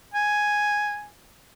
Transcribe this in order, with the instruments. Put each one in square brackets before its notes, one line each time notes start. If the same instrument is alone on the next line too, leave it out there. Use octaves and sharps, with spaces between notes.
[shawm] G#5